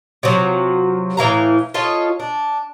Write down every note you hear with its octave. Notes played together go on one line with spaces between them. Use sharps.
C3 F3 F#3
A2 E3 F5 A#5
F4 A4 C#5 D#5
D4